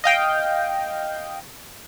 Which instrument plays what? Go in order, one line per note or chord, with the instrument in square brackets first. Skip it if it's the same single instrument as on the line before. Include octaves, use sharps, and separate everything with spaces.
[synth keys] D#5 F5 G5